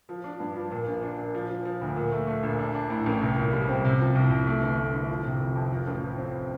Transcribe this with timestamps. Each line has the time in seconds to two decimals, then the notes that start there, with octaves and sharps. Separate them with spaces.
0.09 F3
0.24 D4
0.40 G2
0.56 F3
0.71 A#2
0.86 A#1
1.03 D4
1.18 A#2
1.34 F3
1.50 F3
1.65 F3
1.81 D2
1.96 A#2
2.12 A3
2.27 A3
2.43 A#1
2.59 D4
2.75 D4
2.90 A2
3.06 A1
3.21 C2
3.37 A#2
3.53 G3
3.69 C4
3.84 C3
4.00 F3
4.15 C2
4.30 C2
4.47 A3
4.62 G1
4.77 A3
4.94 G1
5.10 F3
5.25 C3
5.41 F1
5.55 F2
5.72 F3
5.87 A1
6.03 F3
6.18 C4